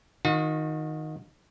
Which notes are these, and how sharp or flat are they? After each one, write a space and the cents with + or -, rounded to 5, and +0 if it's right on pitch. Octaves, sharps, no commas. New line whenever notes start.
D#3 +0 F#4 -45